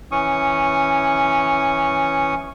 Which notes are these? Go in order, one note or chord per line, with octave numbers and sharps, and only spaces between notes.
E3 C#4 C#6 D#6